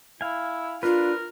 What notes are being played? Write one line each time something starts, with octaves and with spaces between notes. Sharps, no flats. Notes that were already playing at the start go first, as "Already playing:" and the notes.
E4 F5 G#5
D4 F4 A#4 B4